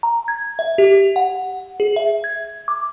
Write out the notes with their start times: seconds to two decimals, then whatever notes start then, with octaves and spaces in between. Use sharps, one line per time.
0.03 A#5
0.28 G#6
0.59 E5
0.78 G4
1.16 F#5
1.80 G#4
1.96 E5
2.24 G#6
2.68 D6